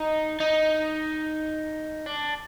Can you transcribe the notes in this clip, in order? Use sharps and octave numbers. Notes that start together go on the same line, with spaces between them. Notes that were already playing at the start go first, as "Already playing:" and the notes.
Already playing: D#4
D#4
D4